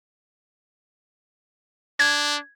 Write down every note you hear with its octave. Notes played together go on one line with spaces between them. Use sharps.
D4 G#6